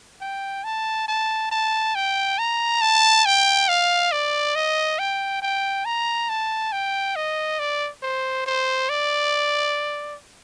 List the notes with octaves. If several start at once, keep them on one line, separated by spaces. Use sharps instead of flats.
G5
A5
A5
A5
G5
A#5
A5
G5
F5
D5
D#5
G5
G5
A#5
A5
G5
D#5
D5
C5
C5
D5